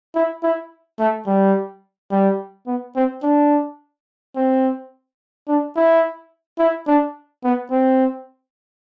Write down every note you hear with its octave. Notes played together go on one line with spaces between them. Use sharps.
E4
E4
A3
G3
G3
B3
C4
D4
C4
D4
E4
E4
D4
B3
C4